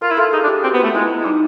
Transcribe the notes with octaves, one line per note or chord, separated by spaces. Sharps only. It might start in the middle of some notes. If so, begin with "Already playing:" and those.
F4 A#4
E4
F4 A4
D#4 G#4
D4
G4
C4 F#4
B3
A3 F4
G#3 E4
G#3
G3 D#4